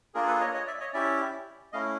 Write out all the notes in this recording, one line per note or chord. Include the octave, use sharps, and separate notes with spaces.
A#3 D4 F4 G#4 A#4
A4 B4
C#5 D#5
C#5 D#5
D5 E5
C#5 D#5
C#4 E4 G4 D5 E5
A3 C#4 E4 D#5 F5